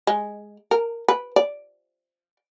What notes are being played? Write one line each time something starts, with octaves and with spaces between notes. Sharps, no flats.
G#3
A#4
B4
D5